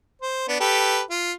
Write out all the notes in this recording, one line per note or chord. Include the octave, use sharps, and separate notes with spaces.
C5
B3 D4
G4 A4 B4
F4